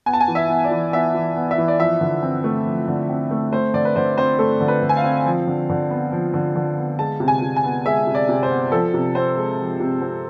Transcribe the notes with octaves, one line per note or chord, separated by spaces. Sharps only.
B3 G#5
A5
G#5
E3
E5
B3
D5
E3
B3 E5
E3
B3
E5
E3
D5
F3 E5
D3
C4
A3
F3
D3
C4
A3
A3 C5
D3 D5
B4
D3 C5
C4 C5
A3 A4
D3
B4
D3
G#5
F5
C4
F3
D3
D3
B3
F3
D3
D3
B3
G#3 A5
C3
G#5
C3
G#5
B3
G#3 E5
C3
D5
C3
C5
B3
F3 A4
C3
C4 C5
G#3
F3
C3
C4